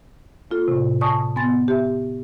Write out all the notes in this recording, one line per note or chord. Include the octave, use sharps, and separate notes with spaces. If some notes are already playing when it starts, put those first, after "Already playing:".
A#3 F4 A4
A2 C3
D5 G#5 A5 C#6 D#6
B3 G#5 C6 A6
G4 E5